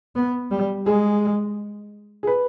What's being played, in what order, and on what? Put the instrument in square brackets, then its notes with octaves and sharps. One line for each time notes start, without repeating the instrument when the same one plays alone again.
[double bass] B3
G3
[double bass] G#3 [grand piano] G#4
[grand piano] G#4
B4